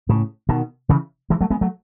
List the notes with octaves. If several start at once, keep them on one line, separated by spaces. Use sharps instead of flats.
A2 C#3
B2 D#3
C#3 E3
E3 G#3
F#3 A3
G#3 B3
F#3 A3